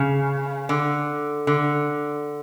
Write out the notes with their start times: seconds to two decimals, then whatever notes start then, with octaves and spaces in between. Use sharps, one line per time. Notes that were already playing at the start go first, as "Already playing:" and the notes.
Already playing: C#3
0.69 D3
1.47 D3